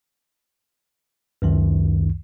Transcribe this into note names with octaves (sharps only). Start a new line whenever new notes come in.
C#2 F#2 D#3